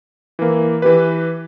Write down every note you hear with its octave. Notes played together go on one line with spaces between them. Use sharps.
E3 A#3
E3 G4 B4